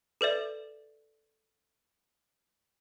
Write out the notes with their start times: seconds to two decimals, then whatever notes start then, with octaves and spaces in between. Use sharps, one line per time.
0.21 A4 B4 D5 E5